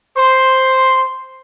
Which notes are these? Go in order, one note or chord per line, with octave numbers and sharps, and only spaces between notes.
C5 C6